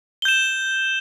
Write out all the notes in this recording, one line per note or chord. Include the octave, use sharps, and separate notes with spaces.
G6 E7 G7